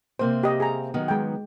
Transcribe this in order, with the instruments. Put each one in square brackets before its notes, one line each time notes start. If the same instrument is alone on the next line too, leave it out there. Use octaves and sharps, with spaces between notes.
[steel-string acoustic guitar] C3 A#3 C4 [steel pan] C5
[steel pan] G4 D#5
G#4 A#5
[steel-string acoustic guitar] D#3 F#3 B3
[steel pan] G#3 G5